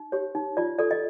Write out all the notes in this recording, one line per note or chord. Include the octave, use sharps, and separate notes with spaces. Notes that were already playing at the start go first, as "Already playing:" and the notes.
Already playing: D#4
G4 C#5
D#4
F4 D5
A4 D5
D#5